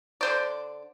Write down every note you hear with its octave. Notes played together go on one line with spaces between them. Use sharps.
D3 C5 D5